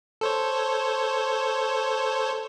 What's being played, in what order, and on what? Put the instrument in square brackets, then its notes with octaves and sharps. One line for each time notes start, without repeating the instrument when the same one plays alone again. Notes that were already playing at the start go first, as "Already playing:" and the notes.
[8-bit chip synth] A4 C5 C#5